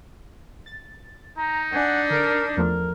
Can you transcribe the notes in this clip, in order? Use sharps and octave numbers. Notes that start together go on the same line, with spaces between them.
A6
D#4 A#5
D4 F#5 G#5
D3 A#4 D7
E2 F3 A3 A#4